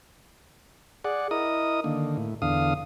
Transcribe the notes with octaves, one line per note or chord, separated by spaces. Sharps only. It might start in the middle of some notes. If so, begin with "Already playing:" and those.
G#4 D5 F#5
E4 A#4 D#5 D#6
D3 D#3 A#3
A2
E2 D3 F5 D#6